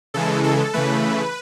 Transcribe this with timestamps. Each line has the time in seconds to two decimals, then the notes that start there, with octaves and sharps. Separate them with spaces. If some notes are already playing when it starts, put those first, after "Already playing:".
0.14 C#3 E3 G#3 A4
0.44 A4
0.73 C#3 E3 A3 B4